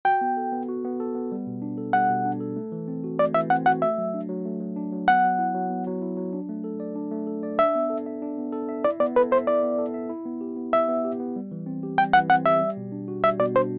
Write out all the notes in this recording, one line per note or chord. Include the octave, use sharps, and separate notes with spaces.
F#4 G5
B3
A4
B3
F#4
B3
A4
B3
G3
B2
D4
A4
G3 F#5
B2
D4
A4
A3
E3
C4
F#4
A3 D5
E3 E5
C4 F#5
F#4 F#5
A3 E5
F#3
D4
F#3
A3
F#3
D4
F#3
B3 F#5
F#3
E4
F#3
B3
F#3
E4
F#3
D4
A3
A4
D5
D4
A3
A4
D5
D4 E5
B3
A4
E5
D4
B3
A4
E5
E4 D5
B3 D5
A4 B4
C5 E5
E4 D5
B3
A4
E5
E4
B3
G4
B3
E4 E5
B3
G4
B3
G3
E3
C4
G4
G3 G5
E3 F#5
C4 F#5
G4 E5
G3
B2
D4
F#4
G3 E5
B2 D5
D4 C5